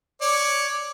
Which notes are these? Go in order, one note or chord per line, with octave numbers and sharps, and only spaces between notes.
C#5 D5